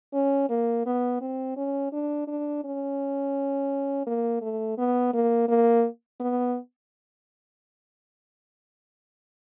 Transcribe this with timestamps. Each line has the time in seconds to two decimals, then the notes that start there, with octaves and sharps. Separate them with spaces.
0.14 C#4
0.50 A#3
0.86 B3
1.21 C4
1.57 C#4
1.93 D4
2.28 D4
2.64 C#4
4.07 A#3
4.42 A3
4.78 B3
5.14 A#3
5.49 A#3
6.20 B3